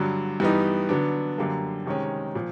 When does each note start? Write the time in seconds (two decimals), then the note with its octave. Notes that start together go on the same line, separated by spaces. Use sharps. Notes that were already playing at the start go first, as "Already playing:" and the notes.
Already playing: G2 D3 F#3
0.40 G2 E3 G3 B3 D#4
0.89 D3 F#3 B3 D4
1.38 F#2 D3 G3 A#3
1.86 C3 D#3 G#3 C#4
2.35 A#2 F3